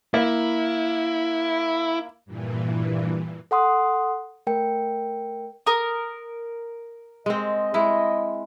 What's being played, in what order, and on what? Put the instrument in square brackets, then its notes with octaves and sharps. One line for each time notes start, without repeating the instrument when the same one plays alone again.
[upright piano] A#3 [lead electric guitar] E4
[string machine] G2 A#2 E3
[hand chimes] A4 F#5 C6 D#6
A3 A#4 G5
[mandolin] A#4 D#6
[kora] G#3 C4 [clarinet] D#5
[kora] G#3 E4